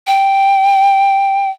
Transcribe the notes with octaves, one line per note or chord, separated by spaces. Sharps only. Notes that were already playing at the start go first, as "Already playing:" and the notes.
G5